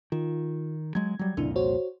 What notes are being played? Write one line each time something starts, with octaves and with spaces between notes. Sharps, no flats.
D#3 F4
F#3 G#3 G#6
F#3 G3
C2 F2 A#2 C#3 D4 E4
F#4 C5 C#5